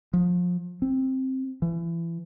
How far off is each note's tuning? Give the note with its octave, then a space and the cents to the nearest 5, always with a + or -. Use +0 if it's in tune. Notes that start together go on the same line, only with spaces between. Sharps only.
F3 +30
C4 +10
E3 +30